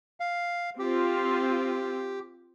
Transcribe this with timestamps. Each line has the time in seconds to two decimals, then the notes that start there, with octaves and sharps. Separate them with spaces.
0.20 F5
0.79 C4 F4 G4